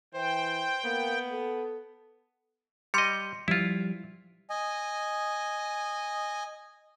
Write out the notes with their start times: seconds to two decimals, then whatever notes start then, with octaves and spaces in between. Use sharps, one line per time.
0.14 E3 C5 G5
0.84 A#3 B3
1.32 A4
2.94 G3 D#5 C6 C#7
3.48 F3 G3 E4 F4
4.50 D#5 G#5